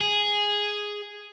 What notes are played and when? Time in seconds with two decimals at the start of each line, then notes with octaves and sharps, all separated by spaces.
0.01 G#4